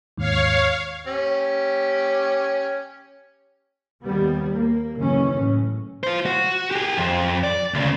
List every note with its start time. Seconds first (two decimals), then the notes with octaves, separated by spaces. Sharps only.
0.17 D#2 G#2 C#5 F5
1.07 C#4 G4
4.03 D#2 G3 B3
4.53 A#3
4.97 F#1 D#2 E3 C#4
5.35 A2
6.04 F4 C5
6.26 F#4
6.71 G4 G#4
6.97 F2
7.44 D5
7.74 D2 C#3